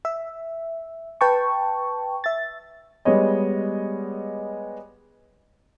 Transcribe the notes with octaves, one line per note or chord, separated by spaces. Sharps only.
E5
B4 G5 A5 C#6
E5 A6
G3 G#3 B3 C#5 D#5